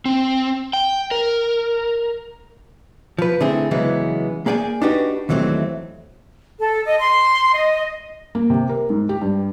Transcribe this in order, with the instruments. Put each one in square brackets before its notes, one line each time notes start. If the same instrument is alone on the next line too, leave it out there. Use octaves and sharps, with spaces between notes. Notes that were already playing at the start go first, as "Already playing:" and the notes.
[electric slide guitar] C4
G5
A#4
[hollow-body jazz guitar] F3 B4
D3 A3 C4 E4 G#4
C#3 E3 F#3 G#3 B3
A#3 G#4 D5 G5 G#5
D4 D#4 F#4 G4 B4
D#2 E3 F#3 A3 C4
[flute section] A4
D#5
C6
D#5
[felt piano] A#3
C3
A#4
G#2
G4
G2